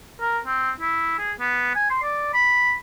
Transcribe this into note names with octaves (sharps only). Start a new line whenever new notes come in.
A#4
C4
E4
G#4
B3
G#5
C6
D5
B5